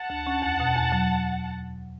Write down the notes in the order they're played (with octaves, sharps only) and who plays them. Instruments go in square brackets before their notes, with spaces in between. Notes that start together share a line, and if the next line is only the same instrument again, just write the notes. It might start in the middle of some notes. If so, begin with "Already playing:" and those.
Already playing: [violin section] F#5 A5
[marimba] D2
C#4
E2
B2
E2
F#3